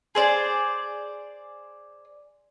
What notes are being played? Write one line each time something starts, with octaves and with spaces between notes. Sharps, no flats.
G#4 C5 D5